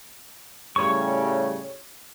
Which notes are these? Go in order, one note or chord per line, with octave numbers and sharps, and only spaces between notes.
A2 C#3 G3 C#5 C#6